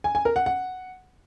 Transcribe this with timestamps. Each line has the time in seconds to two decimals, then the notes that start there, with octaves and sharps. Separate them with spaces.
0.04 G#5
0.15 G#5
0.25 A#4
0.36 F#5
0.46 F#5